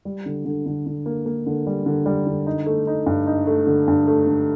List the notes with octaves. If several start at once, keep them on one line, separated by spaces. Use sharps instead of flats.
G3
D3
D3
D3
D3
A#3
A#3
D3
G3
D3
G3
D3
D#4
A3
D#4
G2
D#4
A3
D3
G2
A3
D3